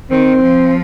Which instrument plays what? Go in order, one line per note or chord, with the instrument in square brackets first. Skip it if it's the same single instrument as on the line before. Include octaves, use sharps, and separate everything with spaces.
[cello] D#3 [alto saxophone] C4
[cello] F3